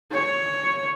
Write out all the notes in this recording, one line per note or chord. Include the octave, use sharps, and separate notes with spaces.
C#5